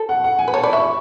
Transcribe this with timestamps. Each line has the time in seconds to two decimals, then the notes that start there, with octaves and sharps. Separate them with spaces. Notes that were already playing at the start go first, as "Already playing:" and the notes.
Already playing: A4
0.09 F#5
0.24 F#5
0.39 G#5
0.48 B4
0.53 C#5 A5
0.63 D5 B5
0.73 E5 C#6